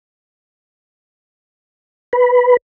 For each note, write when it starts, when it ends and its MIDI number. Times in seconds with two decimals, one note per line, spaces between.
2.13 2.57 71